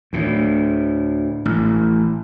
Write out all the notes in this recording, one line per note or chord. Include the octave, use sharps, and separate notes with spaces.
D2 A2
A1